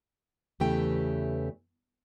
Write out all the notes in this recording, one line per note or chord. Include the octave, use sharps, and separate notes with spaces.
E2 C#3 E3 A3 G4 G5